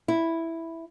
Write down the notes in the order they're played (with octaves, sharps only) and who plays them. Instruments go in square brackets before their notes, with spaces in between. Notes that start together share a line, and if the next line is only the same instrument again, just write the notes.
[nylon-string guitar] E4